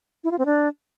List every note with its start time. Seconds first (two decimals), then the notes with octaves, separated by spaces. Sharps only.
0.24 E4
0.31 F4
0.38 C4
0.46 D4